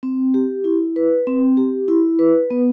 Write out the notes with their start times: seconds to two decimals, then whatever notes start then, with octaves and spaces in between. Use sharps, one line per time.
0.03 C4
0.34 G4
0.64 E4
0.96 B4
1.27 C4
1.57 G4
1.88 E4
2.19 B4
2.50 B3